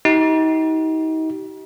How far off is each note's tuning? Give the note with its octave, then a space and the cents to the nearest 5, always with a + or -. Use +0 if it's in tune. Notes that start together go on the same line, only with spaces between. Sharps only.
D#4 +35 G4 -35